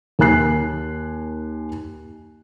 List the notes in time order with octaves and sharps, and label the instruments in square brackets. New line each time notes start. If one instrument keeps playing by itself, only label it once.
[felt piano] D#2 A#4 G#5 F#6 C7